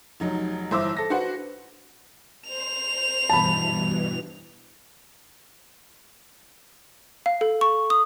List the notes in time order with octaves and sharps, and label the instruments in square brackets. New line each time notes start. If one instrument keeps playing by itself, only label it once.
[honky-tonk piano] F1 F#3 D#4
G1 E3 C5 E5 D6 E6
A4 A#6
D4 F#4 B4 C5 F#5
[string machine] C5 [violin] F7
[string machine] G2 B2 E3 [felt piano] A5 B5
[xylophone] F5
A4
C#6
D#6